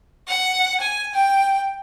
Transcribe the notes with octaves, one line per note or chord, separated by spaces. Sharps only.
F#5
G#5
G5